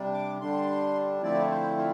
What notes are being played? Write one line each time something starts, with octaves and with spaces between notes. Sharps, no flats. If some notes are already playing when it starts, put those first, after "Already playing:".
Already playing: C3 G3 D4
D6
D3 G3 D4 C6
D3 F3 A3 C4 E4 D5
C5
F4